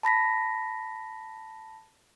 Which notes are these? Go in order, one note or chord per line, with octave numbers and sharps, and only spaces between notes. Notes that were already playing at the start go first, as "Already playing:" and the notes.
A5 B5 A#6 B6